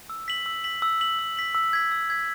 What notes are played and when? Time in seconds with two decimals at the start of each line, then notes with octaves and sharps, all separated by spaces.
0.10 E6
0.28 B6 F#7
0.46 E6
0.64 B6 F#7
0.82 E6
1.01 B6 F#7
1.19 E6
1.37 B6 F#7
1.55 E6
1.73 G#6 B6
1.92 E6
2.10 G#6 B6